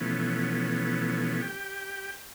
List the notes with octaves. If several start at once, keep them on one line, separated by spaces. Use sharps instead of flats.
B2 E3 F3 A3 B3 C#4
G4 G5